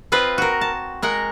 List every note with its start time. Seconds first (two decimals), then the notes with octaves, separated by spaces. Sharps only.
0.12 C4 F4 B4 D#5
0.38 F#4 A#4
0.61 A5
1.02 G#3 A#4 F#5